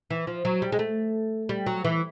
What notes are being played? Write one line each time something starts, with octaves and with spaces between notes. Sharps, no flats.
E3
F3
F#3
G3
G#3
A3
G3
F#3
E3